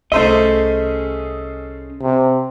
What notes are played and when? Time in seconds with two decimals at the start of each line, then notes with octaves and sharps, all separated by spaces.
0.12 C2 A3 C#4 G#4 C5 D#5 E5
2.01 C3